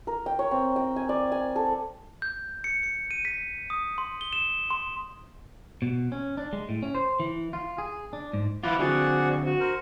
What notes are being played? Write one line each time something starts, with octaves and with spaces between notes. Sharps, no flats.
A#4
G5
C#5
C4
G5
G#5
D5
G#5
A4
G6
C#7
C#7
D#7
B6
D#6
C6
G7
E7
C6
B2
C#4
D4
G#3
A2
C#4
C5
E3
F4
G#4
D4
G#2
E3 E4 F4 F#5 D6
D3 C4 F#4 G#4 D5 F#5
F#4
A#4 C5